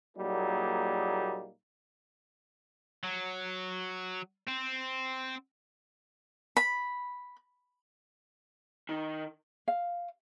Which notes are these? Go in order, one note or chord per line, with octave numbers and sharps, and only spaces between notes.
A#2 F#3 G3 A#3 D#4 G#4
F#3
C4
B5
D#3
F5